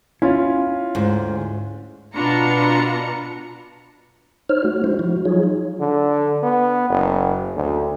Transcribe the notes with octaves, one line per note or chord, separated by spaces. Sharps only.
C#4 E4 F4
D2 G#2
B2 D4 F4 B4 A#5 C#7
D#4 C5 C#5 F6
A3 F#4
G#3 D4 E4 F#4 C5
F3 E4 F#4
F3 F#3 D#4 F4 G#4 C#5
D3
B3
F#1
D2